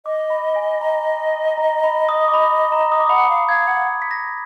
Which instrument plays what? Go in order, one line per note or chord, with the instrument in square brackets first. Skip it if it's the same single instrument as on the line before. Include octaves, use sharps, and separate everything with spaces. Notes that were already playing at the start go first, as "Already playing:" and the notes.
[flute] D#5 [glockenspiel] D6
[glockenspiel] B5
G#5
A#5
A#5
B5
D#6
D6
B5
A#5
D#6
D6
[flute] F#5 [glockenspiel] B5
[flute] F5
[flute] F5 [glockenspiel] G#6
[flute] F#5
[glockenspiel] B6
A#6